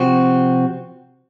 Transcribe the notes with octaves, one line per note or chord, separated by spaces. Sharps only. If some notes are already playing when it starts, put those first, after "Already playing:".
Already playing: C3 F3 C4 F#4